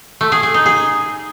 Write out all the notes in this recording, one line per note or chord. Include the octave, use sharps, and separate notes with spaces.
A3
G#4
G#4
D#4
G#4